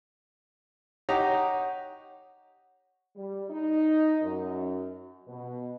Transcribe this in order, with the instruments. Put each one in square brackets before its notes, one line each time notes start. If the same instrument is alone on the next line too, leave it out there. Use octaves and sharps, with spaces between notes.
[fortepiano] D#4 G4 A#5 [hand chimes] C#5 F#5
[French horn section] G3
D#4
F#2
B2